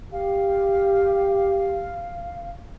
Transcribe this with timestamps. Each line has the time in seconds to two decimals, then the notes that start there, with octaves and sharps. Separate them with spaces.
0.12 G4 F5